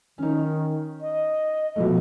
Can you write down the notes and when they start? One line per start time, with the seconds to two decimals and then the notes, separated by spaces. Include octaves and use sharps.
0.18 D#3 C#4 D#4
1.01 D#5
1.76 B2 F3 A3